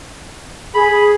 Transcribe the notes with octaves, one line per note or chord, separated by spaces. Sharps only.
G#4 B5